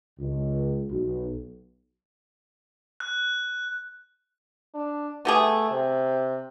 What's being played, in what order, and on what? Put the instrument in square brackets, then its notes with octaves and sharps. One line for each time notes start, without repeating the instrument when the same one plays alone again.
[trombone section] C#2
B1
[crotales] F#6
[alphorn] D4
[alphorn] A3 [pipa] B3 G4 G#4
[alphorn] C3